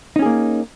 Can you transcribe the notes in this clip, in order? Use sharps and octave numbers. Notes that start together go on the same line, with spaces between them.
A#3 C#4 D#4 G#4